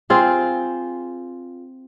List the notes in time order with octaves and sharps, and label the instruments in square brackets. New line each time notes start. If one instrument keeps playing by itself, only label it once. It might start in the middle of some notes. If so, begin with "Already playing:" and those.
[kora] C4 F4 G#4